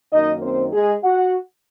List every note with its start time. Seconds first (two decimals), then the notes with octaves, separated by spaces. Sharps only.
0.12 F#2 D#3 A#3 D#4 D#5
0.42 C4 C5
0.73 G#3 G#4
1.04 F#4 F#5